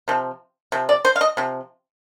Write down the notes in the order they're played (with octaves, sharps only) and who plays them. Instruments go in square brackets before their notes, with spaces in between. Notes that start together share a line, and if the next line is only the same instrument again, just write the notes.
[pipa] C3 F3
C3 F3
D5
C5
F5
D#5
C3 F3